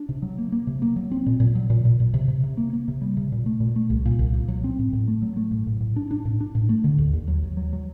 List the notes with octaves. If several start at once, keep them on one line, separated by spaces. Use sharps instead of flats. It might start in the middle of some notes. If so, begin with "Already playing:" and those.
Already playing: D4
C3
F#3
A#3
A#3
C3
A#3
F#3
C4
A#2
A#2
F#3
A#2
A#2
A#2
C3
C3
C3
A#3
A#3
C3
G3
C3
A#2
A3
A#2
A3
C2
A#2
C2
A#2
F#3
C4
A2
A2
A3
F#3
A3
A2
A2
A2
D4
D4
A2
D4
A2
A3
D3
D#2
D#2
F#3
D#2
F#3
F#3